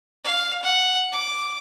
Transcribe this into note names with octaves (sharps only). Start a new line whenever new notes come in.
F5
F#5
D6